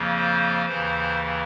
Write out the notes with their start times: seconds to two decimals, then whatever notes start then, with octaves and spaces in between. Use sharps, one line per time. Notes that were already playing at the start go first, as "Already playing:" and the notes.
Already playing: F2 C#3 F3 A#3
0.15 C5
0.66 D#2 C#3 E3 C5